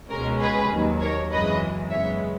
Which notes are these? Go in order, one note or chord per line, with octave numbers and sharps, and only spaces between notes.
C#2 B2 G#3 C#4 A#4
G#4 B4
D#2 D#3 F#3
A#4 C#5
G#1 F#2 C#3 E3 G#3 B4 D#5
F#2 C#3 G#3 B3 C#5 E5